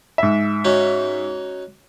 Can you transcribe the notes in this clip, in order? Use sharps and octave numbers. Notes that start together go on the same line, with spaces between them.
G#2 E5
C#4 D#4 F#4